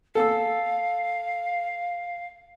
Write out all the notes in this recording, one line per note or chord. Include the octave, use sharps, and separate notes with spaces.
A4 F5 E6